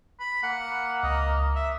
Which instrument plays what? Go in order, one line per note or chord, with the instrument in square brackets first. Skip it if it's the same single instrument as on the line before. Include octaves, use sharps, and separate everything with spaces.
[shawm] B5
[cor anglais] A#3 [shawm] F#5
[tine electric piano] C#2 [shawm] D#5
[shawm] E5